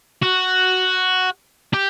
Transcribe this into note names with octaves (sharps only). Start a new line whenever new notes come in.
F#4
G4